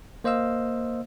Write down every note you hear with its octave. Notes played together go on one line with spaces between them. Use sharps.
A#3 C5 D#5 F5 E6